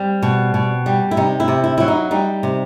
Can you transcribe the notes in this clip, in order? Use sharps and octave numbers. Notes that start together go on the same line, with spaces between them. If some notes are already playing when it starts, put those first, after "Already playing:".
Already playing: G3 C4
B2
B2
G3
E4
C3 D#4
E4
C3
E4
F#3 E4
D#4
G3 D#4
C3